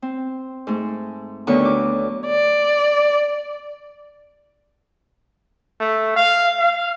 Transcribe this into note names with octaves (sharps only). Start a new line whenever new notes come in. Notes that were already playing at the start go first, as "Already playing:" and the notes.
C4
G#2 A3
D2 D3 D#3 F#3 B3 C#6
D6
D5
A3
F5
F5